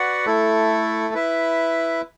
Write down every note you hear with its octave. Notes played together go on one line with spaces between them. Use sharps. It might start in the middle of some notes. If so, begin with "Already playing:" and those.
Already playing: F#4 B4 D5 F#5
A3 E4 A4
E4 B4 E5